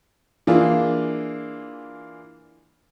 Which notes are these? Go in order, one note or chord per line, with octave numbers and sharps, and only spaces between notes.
E3 A#3 D4 F4 G#4